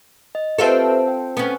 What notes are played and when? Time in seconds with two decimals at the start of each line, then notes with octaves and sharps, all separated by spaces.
0.35 D#5
0.58 C4 F4 G4 A4 B4 E5
1.08 G5
1.37 B3 C#4